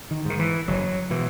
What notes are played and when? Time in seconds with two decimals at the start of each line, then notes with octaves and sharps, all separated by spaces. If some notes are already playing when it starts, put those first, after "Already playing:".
0.11 D#3
0.25 G#2 D#3
0.39 E3
0.68 F#1 F#3
1.10 B2 E3